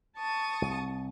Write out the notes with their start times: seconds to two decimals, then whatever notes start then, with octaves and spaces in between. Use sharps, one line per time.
0.17 A5 C#6 D#6
0.62 C2